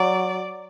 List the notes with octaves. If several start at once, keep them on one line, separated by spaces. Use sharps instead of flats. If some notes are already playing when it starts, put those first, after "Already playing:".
Already playing: F#3 D5